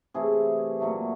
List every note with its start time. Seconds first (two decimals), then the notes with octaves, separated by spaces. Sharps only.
0.14 C3 E3 A3 G#4
0.80 A#2 F#3 A3